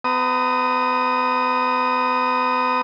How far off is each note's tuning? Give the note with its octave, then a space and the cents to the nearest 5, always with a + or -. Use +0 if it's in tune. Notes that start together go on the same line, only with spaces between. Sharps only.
B3 +40 A#5 -20 D#6 +0